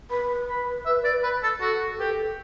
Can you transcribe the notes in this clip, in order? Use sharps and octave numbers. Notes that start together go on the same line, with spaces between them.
B4 B5
B5
E5
D5
B4
A4
F#4 A4
G4 A4 B4